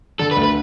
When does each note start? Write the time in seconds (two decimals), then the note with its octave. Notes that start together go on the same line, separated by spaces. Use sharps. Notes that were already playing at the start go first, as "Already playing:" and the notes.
0.19 D3 A4
0.31 B4
0.36 D2
0.43 B4